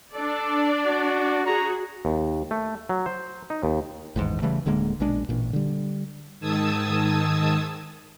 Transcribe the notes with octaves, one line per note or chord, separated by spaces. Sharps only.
D4 A4 D5
F#4
F#4 G#4 A#5
D#2
A3
F#3
C5
D#4
D#2
A1 E2 G#2 D#3
C#3 E3 G3 A3
D1 D3 G#3 A#3
A#1 B2 G#3 D4
A1 A#2
D3 G3
G#2 D#3 A5 D#6 E6 G#6